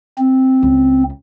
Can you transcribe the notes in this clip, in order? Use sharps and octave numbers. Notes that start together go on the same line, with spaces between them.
C4
C#2